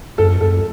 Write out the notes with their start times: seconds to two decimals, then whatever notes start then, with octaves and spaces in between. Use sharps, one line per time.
0.18 F#2 A4
0.41 F#2 A4